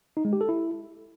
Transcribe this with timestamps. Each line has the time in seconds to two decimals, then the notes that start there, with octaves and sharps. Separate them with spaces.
0.17 D#4
0.25 G#3
0.33 G4
0.41 A4
0.49 E4